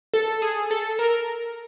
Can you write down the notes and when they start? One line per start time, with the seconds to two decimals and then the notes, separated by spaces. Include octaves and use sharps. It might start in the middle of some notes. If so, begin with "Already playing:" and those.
0.14 A4
0.42 G#4
0.71 A4
0.99 A#4